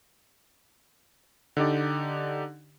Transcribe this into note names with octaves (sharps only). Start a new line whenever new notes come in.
D3 D#4 G4 D5